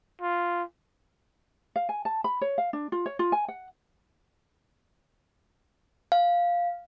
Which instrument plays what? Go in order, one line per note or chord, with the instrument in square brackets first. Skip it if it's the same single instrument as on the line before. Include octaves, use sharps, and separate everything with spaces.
[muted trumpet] F4
[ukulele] F5
G#5
A5
B5
C#5
F5
D4
F4
C#5
F4
G#5
F#5
[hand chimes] F5